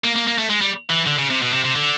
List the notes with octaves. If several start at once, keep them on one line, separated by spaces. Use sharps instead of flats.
A#3
A#3
A#3
A3
G#3
G3
E3
D3
C#3
C3
B2
C3
C3
D3